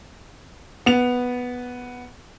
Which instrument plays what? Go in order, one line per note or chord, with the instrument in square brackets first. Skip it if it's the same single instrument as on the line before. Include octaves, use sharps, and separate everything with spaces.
[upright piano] B3 F7